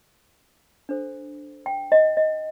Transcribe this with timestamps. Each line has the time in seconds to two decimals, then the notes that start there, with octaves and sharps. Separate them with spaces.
0.89 D4 A4 C5
1.66 G5
1.92 D#5
2.17 D#5